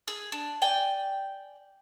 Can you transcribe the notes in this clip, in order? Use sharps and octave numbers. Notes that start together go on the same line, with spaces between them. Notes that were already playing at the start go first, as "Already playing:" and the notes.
G#4 E6
D4
D5 G5 G#5